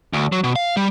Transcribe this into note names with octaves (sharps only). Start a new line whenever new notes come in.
D2
F#3
B2
F5
G3